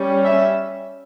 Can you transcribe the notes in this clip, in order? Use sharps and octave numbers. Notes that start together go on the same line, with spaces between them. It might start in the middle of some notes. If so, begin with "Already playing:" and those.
Already playing: G3 C#4
E5